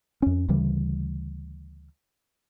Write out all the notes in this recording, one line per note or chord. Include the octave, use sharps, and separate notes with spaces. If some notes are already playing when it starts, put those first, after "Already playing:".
F2 C#4
D2 C#3 E3 G3